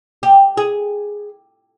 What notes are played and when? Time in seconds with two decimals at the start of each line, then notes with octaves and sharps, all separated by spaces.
0.23 G4
0.57 G#4